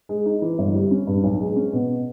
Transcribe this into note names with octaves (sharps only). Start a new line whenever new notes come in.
G#3
D#4
E3
G1
G3
C#4
G2
B1
G#3
C#4
B2